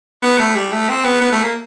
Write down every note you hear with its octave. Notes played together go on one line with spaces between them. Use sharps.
B3
A3
G3
A3
C4
B3
B3
A3
A#3